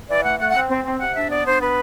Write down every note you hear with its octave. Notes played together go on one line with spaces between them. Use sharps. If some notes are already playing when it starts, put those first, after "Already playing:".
E3 D5
A3 F#5
A3 F#5
F#5
C4
C4
C4
C3 F#5
D4 E5
B3 D5
D4 C5
B3 B4